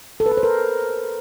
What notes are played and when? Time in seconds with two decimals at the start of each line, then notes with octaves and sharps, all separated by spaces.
0.20 A4
0.26 B4
0.32 A4
0.37 C5
0.43 A#4